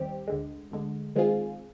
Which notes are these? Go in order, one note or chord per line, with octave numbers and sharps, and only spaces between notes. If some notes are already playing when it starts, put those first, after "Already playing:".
Already playing: D#2 D#3 G3 C4 G4
D2 D3 G#3
D2 D3 G#3
D#3 G#3 C4 F4 G#4